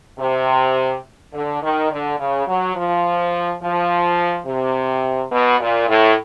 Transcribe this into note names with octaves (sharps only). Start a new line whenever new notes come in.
C3
D3
D#3
D3
C#3
F#3
F3
F3
C3
B2
A#2
A2